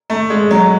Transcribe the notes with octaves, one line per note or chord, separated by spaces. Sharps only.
A3
G#3
F#3